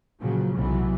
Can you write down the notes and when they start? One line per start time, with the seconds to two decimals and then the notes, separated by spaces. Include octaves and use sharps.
0.20 A#2 C#3 F3 F#3
0.55 B1 C3 E3 F#3 B3